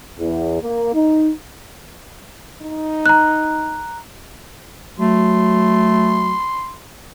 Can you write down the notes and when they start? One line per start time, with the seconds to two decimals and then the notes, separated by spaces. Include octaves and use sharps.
0.18 E2
0.62 A#3
0.93 D#4
2.62 D#4
3.06 A#5 F#6
4.99 F#3 A3 C6